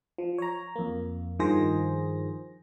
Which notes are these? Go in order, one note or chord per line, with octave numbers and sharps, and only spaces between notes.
F3
C#5 A#5
F2 A#3
G2 D#3 F3 G#4 C5 A#6